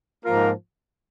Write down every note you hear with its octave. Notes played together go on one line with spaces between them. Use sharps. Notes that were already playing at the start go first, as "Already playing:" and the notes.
G#2 F3 A#3 F4 A#4